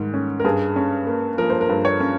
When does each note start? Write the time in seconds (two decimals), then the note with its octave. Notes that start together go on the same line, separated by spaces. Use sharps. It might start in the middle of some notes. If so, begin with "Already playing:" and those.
Already playing: G#2 D#3 G3
0.14 C#4
0.40 A#4
0.44 G2 G#4
0.76 C#4
1.07 A#3
1.38 F3 A#4
1.50 C5
1.61 A#4
1.69 G2
1.85 C#5
2.00 C#4